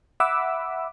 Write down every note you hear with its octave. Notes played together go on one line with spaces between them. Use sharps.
E5 F#5 B5 D6 E6